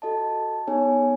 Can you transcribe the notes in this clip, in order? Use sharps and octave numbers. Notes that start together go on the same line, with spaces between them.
F#4 A4 D#5 A5
B3 D#4 G#4 C#5 G#5